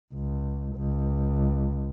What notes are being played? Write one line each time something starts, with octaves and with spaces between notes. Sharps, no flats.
C#2
C#2